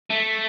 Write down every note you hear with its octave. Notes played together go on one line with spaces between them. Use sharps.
A3